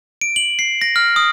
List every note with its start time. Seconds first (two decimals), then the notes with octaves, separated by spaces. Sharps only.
0.21 D7
0.36 F#7
0.59 C7
0.81 A#6
0.96 F6
1.16 D#6